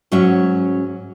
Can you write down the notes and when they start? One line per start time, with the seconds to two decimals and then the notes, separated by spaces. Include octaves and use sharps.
0.12 G#2 F#3 C#4 F#4 E5